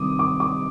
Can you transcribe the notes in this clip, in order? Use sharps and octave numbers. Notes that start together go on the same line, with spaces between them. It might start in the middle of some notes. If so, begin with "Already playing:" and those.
Already playing: C3 D#3 G3 D6 D#6
D6
D6